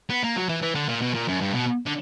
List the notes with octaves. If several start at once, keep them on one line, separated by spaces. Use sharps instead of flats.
B3
A#3
F#3
E3
E3
D3
A#2
B2
A#2
F#2
G2
B2
D3